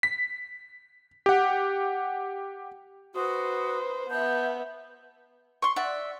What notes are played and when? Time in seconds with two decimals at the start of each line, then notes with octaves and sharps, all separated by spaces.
0.03 B6
1.26 G4 F#5
3.15 F#4 B4 C5 D#6
4.09 B3 E5 A5 G6
5.62 C6 C#6
5.76 D5 E5 F#5